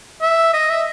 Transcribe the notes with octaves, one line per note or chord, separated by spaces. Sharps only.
E5
D#5
E5